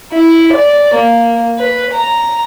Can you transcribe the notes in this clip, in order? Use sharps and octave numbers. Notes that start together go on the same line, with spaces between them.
E4
D5
A#3
B4
A#5